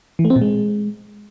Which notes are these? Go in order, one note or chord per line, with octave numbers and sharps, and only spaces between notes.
E3
A3
C4
A#2
G#3